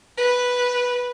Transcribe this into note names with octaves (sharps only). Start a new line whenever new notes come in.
B4